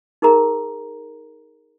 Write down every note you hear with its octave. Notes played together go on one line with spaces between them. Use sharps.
D#4 G#4 A#4 A#5